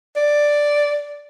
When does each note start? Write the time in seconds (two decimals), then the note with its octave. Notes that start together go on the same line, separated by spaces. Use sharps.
0.16 D5